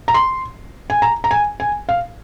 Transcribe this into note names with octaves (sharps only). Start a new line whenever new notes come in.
A#5
C6
G#5
A#5
A#5
G#5
G#5
F5